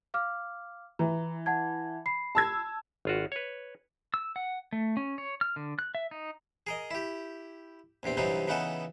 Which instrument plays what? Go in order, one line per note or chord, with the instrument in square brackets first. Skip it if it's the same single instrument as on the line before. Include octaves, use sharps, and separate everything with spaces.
[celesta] F5 D6 F6
[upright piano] E3 [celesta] A#5
[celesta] F#5 A5 G#6
B5 C7
[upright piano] A5 E6 G#6
[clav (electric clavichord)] G#1 F4 F#4
B4 C#5
[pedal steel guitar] E6
F#5
A3
C#4
C#5
F6
D3
F#6
E5
D#4
[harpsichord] G#4 A#4 D#5
E4 G4
A#1 E2 C3 C4
G2 C3 E3 F#3 C4 D#4
C#3 E3 B3 D#4 F#4 A4